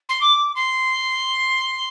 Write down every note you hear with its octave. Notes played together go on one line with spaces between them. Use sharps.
C6
D6
C6